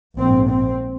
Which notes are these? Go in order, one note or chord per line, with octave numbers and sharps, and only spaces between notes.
A#1 G#2 C4
C4